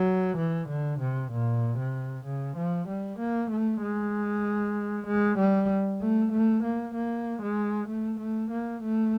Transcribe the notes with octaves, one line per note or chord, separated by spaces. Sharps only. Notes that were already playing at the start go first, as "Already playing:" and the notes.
Already playing: F#3
E3
D3
C3
A#2
C3
C#3
F3
G3
A#3
A3
G#3
G#3
G3
A3
A3
A#3
A#3
G#3
A3
A3
A#3
A3